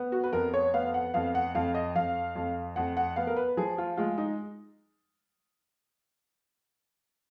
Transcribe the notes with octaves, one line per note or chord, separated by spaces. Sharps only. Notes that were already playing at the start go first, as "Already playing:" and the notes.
Already playing: B3
F#4
B4
F2 A#4
C#5
B3 F5
F#5
F2 F5
F#5
F2 F5
D#5
F2 F5
F2
F2 F#5
F#5
B3 F5
A#4
B4
F3 G#4
F4
G#3 F4
D#4